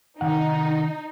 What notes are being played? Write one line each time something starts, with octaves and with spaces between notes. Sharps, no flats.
C3 D#3 D#4 F#5